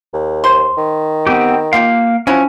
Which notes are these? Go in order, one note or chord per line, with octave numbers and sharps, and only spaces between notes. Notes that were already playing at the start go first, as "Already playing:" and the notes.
D#2
C5 C6
D#3
B3 C4 G4
A#3 F4 G4 F5 G5
F3 F#3 C#4 E4 C#5